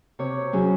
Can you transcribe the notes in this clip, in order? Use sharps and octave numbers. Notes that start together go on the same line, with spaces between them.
C3 C#5
F#3 C#4 G#4